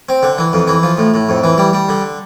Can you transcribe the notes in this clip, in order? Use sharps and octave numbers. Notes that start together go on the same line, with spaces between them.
C4
D3
E3
F2
E3
F3
A2
A2
F2
E3
G3
G3
D3